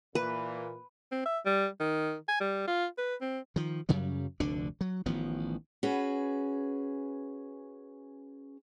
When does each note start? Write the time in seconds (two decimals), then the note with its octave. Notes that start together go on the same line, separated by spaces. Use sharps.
0.15 A#2 E3 A#3 B4
1.12 C4
1.25 E5
1.45 G3
1.80 D#3
2.28 G#5
2.40 G3
2.67 F4
2.98 B4
3.21 C4
3.56 D#3 F3
3.89 F#2 C#3 F#3 G3
4.40 F1 D2 D3 D4
4.81 F#3
5.06 A1 D#3 F3 B3
5.83 C#4 F#4 G#4 B4